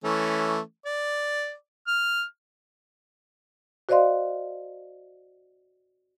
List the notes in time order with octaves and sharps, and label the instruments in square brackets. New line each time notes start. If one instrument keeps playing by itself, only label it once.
[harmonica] E3 A3 C#4
D5
F6
[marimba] F#4 C5 D5 D#5 F5 C6